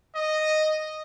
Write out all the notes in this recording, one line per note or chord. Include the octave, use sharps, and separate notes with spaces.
D#5